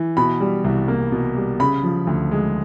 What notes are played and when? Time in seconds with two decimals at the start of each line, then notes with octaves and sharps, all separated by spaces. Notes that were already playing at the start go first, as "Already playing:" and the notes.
Already playing: E3
0.17 B2 B5
0.40 G3
0.64 C2
0.88 A#3
1.12 B2
1.36 G3
1.60 C#3 B5
1.83 F3
2.07 D2
2.31 G#3